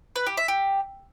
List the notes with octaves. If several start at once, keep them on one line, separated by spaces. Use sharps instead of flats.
B4
G4
E5
G4